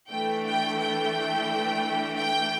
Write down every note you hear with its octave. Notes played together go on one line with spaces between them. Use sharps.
E3 A3 D4 G5
G5
G5
G5